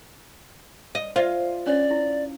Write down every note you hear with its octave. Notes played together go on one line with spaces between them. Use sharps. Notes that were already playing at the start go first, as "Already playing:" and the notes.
D#5
F4 C5 D5 E5
C#4 D4 C#5 D5
E4